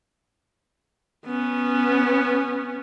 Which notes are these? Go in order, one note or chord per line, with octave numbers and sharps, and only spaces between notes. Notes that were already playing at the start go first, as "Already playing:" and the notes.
B3 C#4